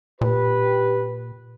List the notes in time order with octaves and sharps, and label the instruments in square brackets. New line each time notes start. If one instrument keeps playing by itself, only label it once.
[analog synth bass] A#2 [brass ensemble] G4 B4